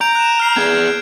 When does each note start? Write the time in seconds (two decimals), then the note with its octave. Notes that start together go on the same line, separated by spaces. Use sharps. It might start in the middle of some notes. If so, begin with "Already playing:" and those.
0.01 A#5 G6 D7
0.15 F#6 E7
0.40 F6 C7
0.57 B3 G#4 G#6